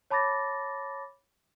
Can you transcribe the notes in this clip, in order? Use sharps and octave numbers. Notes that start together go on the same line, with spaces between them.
C#5 A5 B5 D6 A6 A#6